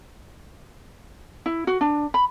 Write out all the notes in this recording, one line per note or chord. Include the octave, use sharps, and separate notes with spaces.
E4
F#4
D4
B5